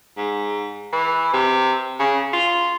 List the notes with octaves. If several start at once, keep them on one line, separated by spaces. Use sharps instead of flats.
G#2
E3
C3
C#3
F4